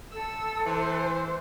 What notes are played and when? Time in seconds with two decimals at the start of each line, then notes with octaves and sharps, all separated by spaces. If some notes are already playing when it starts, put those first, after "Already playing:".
0.13 A4 E6
0.66 E3 C5